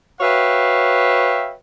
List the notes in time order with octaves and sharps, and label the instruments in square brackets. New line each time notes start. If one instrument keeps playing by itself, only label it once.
[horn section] F#4 B4 C#5 E5 F5 G5